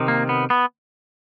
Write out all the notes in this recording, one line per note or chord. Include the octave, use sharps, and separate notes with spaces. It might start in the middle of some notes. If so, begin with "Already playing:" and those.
Already playing: C3 D#3
A#3
B3
B3